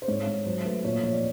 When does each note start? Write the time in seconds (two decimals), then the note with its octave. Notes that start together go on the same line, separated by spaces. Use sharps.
0.02 C5
0.08 G#2 C#5
0.27 G#2
0.46 F#3 C5
0.65 A3 B4
0.84 A#2 C#5
1.03 F3 C#5
1.13 D5